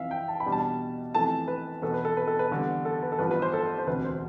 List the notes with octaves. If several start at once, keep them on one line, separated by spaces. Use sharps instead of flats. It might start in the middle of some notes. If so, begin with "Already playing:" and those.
Already playing: F2 C3 E3 E5 F5
G5
A5
B5
E2 B2 G3 D4
A5
F2 C3 E3 A3 A5
B4
E2 B2 B3 A4
B4
A4
B4
A4
B4
E2 D3 G3
A4
B4
A4
A1 G2 F3 B3 B4
B4
C5
A4
C5
E1 D2 C3 B4
C5